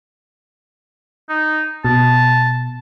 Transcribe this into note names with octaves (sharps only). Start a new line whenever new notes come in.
D#4
B2 A5